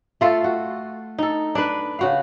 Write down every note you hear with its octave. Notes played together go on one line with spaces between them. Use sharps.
A3 F4 A4
F#4
D#4 A4
D4 B4
C#3 F#4 F5